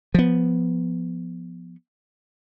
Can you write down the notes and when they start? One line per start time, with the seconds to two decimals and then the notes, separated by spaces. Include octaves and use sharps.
0.14 F3 B3